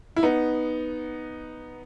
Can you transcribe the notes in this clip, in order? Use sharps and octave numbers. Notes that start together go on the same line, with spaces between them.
E4
B3 D#4